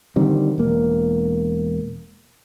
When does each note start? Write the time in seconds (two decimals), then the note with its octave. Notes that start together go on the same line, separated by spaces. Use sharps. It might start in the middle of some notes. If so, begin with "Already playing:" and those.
0.16 D3 D#3 G3 C4
0.58 E1 A#3